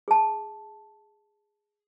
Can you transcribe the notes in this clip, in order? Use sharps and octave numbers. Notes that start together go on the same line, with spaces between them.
G#4 A5